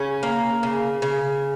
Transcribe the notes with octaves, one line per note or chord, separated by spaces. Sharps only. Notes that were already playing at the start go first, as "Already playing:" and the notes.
Already playing: C#3 C#4
A#3
C#3
C#3